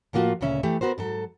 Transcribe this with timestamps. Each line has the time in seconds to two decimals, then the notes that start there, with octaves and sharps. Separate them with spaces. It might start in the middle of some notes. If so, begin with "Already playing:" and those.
0.13 A2 F3 A#3 F4 F#4
0.41 D2 A#2 C#3 C#4 E5
0.63 E3 A3 G4
0.81 B3 F#4 A#4 C5
0.98 G#2 F#3 A4